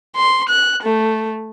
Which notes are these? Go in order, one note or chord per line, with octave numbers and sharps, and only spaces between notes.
C6
F#6
A3